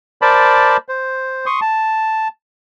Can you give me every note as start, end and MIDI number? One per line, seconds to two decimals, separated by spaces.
0.22 0.77 70
0.22 0.77 72
0.22 0.77 74
0.22 0.77 81
0.22 0.77 83
0.22 0.77 86
0.89 1.46 72
1.46 1.60 84
1.46 1.60 85
1.46 1.60 87
1.61 2.28 81